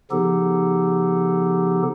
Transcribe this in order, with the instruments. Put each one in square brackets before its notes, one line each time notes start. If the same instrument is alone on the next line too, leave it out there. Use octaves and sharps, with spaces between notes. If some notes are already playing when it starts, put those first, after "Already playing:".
[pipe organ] C#3 F3 B3 D#4 G4 A4